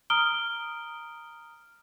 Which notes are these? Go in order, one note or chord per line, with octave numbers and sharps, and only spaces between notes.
A#5 D#6 F6 D7 G7